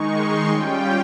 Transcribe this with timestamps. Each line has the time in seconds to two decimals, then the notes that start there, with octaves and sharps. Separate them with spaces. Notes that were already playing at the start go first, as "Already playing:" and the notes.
Already playing: D#3 G#3 D#4 C#6
0.14 C6
0.48 G3 C#4 F4 G5